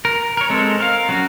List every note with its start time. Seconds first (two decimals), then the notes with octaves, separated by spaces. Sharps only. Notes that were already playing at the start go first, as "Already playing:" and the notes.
0.05 A#4
0.37 A#4 C#5
0.50 G#3 C4 A4
0.80 A#4 F5
1.09 F#3 C#4 F#4